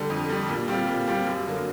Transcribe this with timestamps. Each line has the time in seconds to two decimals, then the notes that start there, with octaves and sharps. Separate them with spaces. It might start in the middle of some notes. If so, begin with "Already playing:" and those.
Already playing: D3 G3
0.10 F2
0.29 D3 G3
0.49 A#2
0.68 G3 C4 F4
0.88 A#2
1.08 G3 C4 F4
1.26 F#2
1.46 D3 F#3 A#3